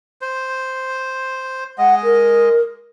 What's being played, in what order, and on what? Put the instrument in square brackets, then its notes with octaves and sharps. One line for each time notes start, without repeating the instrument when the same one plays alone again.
[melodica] C5
[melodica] G#3 D#5 [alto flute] F#5
[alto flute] A#4